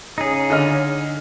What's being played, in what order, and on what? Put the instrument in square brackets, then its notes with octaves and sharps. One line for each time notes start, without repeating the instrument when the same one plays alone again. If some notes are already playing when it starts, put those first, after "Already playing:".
[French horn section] C#3 [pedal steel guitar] D#4 G#4
[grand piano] D3 D#5 F6